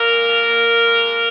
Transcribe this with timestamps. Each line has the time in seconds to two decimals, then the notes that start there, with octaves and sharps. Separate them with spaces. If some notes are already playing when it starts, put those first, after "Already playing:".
Already playing: A#2 A#3 A#4
0.09 G#3
0.28 F3
0.47 A#2
0.65 A#2
0.85 G#3
1.04 F3